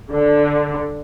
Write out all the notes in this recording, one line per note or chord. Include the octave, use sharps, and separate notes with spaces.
D3